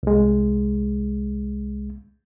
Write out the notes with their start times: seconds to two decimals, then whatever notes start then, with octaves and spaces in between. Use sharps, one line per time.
0.03 C2 G#3